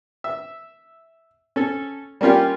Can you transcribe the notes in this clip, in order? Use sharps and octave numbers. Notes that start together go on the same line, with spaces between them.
E5
C#4 A4
G3 A#3 C#4 F4 G4